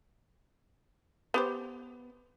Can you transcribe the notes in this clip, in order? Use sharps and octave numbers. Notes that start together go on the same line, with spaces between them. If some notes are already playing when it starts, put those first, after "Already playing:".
B3 G4 C5